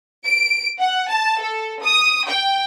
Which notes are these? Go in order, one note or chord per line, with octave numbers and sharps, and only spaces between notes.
D7
F#5
A5
A4
D#6
G5